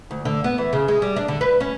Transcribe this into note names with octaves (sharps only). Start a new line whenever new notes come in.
D2
D3
B3
E3
C#3
G#3
G3
D4
D3
B4
C#4